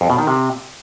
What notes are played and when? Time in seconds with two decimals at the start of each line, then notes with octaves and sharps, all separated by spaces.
0.01 F2
0.10 B2
0.18 D#3
0.27 C3